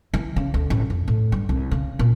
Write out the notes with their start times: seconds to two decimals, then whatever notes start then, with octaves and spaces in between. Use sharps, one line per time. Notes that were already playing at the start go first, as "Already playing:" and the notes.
0.14 E3
0.36 C#3
0.54 D2
0.70 A1
0.90 F2
1.08 A2
1.32 G2
1.49 C2
1.71 C#3
1.99 A#2